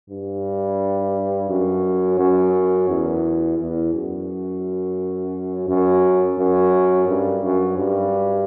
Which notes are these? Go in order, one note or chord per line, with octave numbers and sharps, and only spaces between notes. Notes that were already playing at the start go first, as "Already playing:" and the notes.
G2
F#2
F#2
E2
E2
F#2
F#2
F#2
G2
F#2
G2